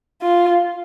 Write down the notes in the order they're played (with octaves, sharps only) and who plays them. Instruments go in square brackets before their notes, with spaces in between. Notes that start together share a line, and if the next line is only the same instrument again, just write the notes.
[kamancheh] F4